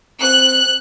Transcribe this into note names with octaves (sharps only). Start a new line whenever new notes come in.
C4 F#6